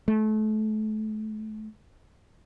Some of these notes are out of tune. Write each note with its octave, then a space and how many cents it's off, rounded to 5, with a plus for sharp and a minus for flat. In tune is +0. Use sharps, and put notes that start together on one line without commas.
A3 -30